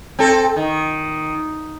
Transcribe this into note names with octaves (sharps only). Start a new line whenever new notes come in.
C4 A4
D#3